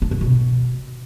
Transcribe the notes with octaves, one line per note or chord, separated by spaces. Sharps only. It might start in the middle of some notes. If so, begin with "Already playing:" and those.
D4
C#3
B2